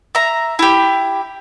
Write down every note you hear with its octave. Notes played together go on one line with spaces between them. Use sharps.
E5 A#5
E4 G4